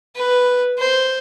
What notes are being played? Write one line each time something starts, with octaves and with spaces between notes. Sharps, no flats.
B4
C5